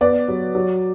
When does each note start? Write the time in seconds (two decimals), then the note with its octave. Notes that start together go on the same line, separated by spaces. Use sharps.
0.01 B3 D5
0.28 F#3
0.55 F#3